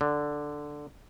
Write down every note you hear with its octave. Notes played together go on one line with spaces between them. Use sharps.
D3